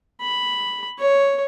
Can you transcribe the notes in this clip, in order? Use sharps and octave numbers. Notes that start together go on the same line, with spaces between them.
B5
C#5